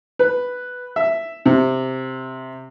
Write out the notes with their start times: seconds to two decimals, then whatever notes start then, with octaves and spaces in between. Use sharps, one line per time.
0.19 B4
0.96 E5
1.46 C3